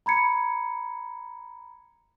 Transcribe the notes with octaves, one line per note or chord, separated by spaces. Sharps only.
A#5 B5 G#6 C#7